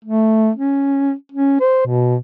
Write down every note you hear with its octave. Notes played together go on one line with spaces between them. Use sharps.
A3
C#4
C#4
C5
B2